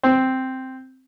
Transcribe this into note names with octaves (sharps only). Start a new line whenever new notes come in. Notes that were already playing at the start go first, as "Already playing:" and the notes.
C4